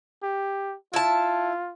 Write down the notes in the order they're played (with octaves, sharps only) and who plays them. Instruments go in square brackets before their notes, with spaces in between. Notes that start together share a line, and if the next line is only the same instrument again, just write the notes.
[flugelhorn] G4
[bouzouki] E4 A5 [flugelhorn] F4